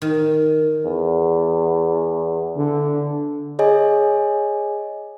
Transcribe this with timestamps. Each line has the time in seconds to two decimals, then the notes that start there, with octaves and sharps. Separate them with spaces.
0.02 D#3
0.86 E2
2.57 D3
3.59 G#4 C#5 D#5 G#5